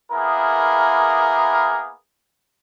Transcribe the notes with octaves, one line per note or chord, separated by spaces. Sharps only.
A#3 B3 E4 G#4 A#4